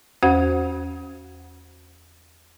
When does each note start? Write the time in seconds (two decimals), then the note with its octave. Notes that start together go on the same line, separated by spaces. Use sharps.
0.23 E2 C#4 F#4 C5 F#5 G#6